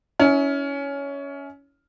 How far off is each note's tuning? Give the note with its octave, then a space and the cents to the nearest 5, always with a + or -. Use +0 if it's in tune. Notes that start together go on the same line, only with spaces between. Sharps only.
C#4 +15 E4 -30